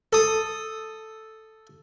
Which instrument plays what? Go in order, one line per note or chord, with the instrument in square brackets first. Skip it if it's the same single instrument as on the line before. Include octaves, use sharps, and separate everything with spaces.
[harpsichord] A4 D#6